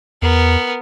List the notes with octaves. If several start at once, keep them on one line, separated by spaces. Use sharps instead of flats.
E2 B3 A#4